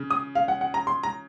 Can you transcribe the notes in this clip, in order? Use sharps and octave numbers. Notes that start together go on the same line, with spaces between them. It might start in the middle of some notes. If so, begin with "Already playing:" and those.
Already playing: C#3
D#6
F5
F#5
F#5
A#5
C6
A#5